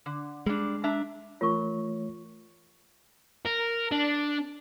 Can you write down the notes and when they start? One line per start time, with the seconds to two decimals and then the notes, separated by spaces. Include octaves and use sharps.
0.06 D3
0.46 G3 G#3 D4
0.84 D4 E5 A#5
1.41 E3 A3 F4 A#4 C#5 C#6
3.45 A#4
3.91 D4